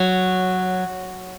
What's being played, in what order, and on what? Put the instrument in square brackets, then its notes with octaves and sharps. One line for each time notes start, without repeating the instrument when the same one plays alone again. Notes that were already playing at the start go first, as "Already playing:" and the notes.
Already playing: [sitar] F#3